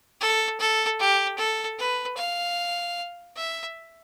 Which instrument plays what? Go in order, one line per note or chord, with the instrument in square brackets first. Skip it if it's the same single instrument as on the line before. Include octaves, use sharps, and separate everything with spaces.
[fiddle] A4
A4
G4
A4
B4
F5
E5